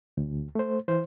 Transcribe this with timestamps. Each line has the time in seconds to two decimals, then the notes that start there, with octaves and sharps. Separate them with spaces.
0.17 D2
0.55 A3 C5
0.88 E3 C5